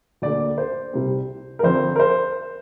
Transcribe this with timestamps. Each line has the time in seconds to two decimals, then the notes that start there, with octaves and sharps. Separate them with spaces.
0.22 D2 D3 A#3 D5
0.58 C5
0.93 C2 C3 G3 C4
1.59 A#4
1.63 F2 D3 F3 C4 C5
1.96 A#4
2.00 C5